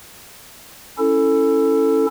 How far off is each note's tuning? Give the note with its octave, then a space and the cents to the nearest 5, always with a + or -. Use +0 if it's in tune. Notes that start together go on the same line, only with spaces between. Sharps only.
C#4 +0 E4 +0 A4 +10